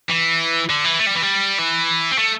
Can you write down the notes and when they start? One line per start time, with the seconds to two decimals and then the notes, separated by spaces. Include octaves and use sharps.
0.10 E3
0.69 D3
0.84 E3
0.99 A3
1.07 G3
1.15 E3
1.22 G3
1.59 E3
2.12 C4
2.18 A3